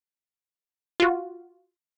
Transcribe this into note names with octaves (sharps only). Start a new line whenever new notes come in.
F4 F#4